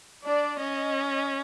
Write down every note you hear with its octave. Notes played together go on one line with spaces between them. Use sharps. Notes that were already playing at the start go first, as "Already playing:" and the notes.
D4 D5
C#4 D#5